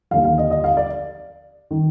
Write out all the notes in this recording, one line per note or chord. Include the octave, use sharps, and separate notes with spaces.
D#2 D3 F3 F5
F5
D#5
D#5
F5
D5
D#3